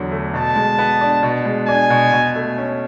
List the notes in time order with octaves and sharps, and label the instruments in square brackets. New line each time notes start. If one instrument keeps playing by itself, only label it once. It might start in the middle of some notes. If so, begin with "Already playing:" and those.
Already playing: [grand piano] E2 D3 F#3
A3
[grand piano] B2 [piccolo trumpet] A5
[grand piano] G#3
B3
D4
B2
G#3
[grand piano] D4 [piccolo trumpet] G#5
[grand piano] B2
B2
A3
C#4